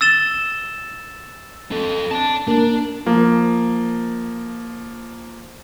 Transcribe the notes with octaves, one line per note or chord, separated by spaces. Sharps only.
E6 A6 E7 G7
C4 A4
D5 A5
A#3 D4 A#4
F3 A#3